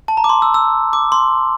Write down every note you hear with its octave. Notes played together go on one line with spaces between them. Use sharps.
A5
A#5
D6
C6
E6
E6
D6
C6